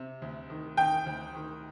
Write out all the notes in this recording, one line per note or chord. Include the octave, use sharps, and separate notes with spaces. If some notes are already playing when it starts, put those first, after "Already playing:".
Already playing: C3
D2
D#3
D#3 G5
D2
D#3